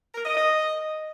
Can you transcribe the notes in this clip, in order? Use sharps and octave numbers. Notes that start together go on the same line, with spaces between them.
A#4
D#5
D#5